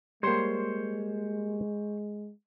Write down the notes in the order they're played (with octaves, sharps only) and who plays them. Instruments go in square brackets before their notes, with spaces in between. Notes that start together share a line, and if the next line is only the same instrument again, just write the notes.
[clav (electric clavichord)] G3 A#3 [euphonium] G#3 [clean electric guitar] C5 C#5 C6